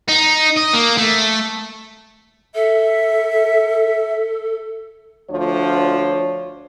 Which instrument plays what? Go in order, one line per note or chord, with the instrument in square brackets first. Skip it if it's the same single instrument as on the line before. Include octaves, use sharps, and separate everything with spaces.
[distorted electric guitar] D#4
D#5
A#3
A3
[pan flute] A4 [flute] E5
[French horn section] D2 F3 D4 C#5